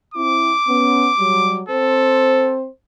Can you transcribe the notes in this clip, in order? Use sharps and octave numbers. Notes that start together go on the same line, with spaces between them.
C4 E4 D6
B3 C#4
F#3 G3
C4 A4 C5